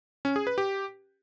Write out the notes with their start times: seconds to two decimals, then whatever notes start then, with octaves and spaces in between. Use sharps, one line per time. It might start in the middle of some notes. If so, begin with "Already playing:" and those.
0.25 C#4
0.36 G#4
0.47 B4
0.58 G4